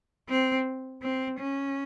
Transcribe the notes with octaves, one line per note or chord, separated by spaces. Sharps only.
C4
C4
C#4